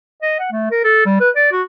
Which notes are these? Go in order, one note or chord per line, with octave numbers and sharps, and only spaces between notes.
D#5
F#5
A3
A#4
A4
G3
B4
D5
F#4